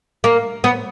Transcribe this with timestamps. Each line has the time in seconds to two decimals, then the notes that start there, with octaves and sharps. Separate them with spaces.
0.24 A#3
0.64 B3